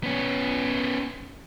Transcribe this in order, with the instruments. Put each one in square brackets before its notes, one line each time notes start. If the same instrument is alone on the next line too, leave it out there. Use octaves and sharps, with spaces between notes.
[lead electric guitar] B3 C#4